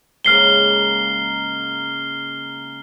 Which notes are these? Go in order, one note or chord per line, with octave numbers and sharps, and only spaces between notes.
G#2 C#3 A#3 F6 C7 G7